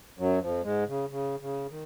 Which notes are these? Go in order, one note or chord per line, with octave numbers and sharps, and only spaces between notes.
F#2 F#3
F2 F3
G#2 G#3
C#3
C#3
C#3
D#3